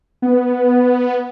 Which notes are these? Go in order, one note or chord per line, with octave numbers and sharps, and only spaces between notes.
B3